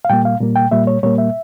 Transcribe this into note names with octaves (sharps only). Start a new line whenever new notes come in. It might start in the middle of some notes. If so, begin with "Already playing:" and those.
F5
A#2 G3 A#3 G5
F5
A#2 G3 A#3
G5
A#2 G3 A#3 E5
C#5
A#2 G3 A#3 C#5
E5